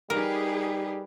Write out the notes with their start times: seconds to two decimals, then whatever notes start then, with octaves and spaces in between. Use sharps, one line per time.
0.10 G3 D#4 G4 G#4 A#4 B4